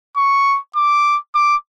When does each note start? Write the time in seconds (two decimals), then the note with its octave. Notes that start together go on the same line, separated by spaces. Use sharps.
0.17 C#6
0.76 D6
1.35 D6